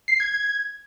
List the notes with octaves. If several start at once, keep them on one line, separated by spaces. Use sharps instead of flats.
C7
G#6
G#6